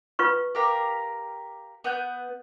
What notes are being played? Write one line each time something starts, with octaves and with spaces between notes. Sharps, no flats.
F4 B4 C#6
G4 A#4 F5
B3 F#5 G6